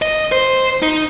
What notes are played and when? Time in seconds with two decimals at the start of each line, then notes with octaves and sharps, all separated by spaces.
0.02 D#5
0.32 C5
0.82 D#4